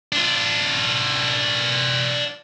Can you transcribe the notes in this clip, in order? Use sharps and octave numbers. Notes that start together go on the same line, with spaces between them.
D4 F4